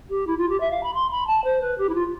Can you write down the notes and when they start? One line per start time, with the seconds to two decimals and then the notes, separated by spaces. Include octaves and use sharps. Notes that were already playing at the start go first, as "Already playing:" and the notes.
0.09 G4
0.27 E4
0.38 F4
0.49 G4
0.60 E5
0.71 F5
0.83 B5
0.94 C6
1.11 B5
1.27 A5
1.44 C5
1.61 B4
1.78 G4
1.89 E4
1.94 F4